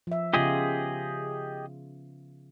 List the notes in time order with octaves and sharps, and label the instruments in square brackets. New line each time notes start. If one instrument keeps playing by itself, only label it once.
[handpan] F3 E5
[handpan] C#3 B3 F4 [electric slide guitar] G4 G#4 D#5